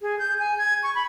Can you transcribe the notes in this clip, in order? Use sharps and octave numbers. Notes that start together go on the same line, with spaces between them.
G#4
G6
G#5
G#6
C#6
B5